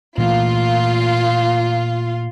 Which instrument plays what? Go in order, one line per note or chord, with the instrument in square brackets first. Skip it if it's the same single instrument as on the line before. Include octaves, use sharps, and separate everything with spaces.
[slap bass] A#2 E3 A3 [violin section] F4